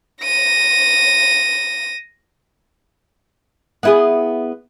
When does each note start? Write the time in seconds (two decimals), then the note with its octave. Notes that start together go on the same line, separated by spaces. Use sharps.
0.24 A#6 D#7
3.83 B3 E4 G#4